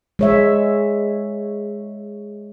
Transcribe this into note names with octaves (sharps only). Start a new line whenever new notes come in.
G#3 C#5 E5